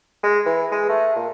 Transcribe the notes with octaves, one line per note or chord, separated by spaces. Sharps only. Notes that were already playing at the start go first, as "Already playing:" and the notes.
G#3
E3
G#3
A3
A#2